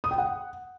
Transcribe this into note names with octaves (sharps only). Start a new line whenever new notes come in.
D#6
G5
F#5